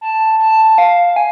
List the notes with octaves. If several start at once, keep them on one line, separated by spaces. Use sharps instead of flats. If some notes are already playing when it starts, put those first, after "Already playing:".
A5
A5
F5
G#5